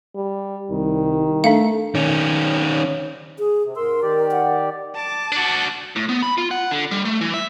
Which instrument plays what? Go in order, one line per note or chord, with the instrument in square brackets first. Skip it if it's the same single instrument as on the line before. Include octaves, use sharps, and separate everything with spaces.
[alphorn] G3
[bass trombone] C2 [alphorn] D#3
[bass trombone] A3 [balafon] D4 E5 F5
[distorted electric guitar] D#3 C#4
[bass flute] G#4
[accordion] C3
[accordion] G#2 C6 E6 [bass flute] A#4
[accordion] D#3 G4 D5
[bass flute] F#5
[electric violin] A5 D6
[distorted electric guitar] D4 F#4
[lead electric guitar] A2
B3
B5
F4
F#5
D3
G3
A3
E3
E5